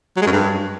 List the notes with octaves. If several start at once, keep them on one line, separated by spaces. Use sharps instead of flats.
F#3
G#3
F#2
G2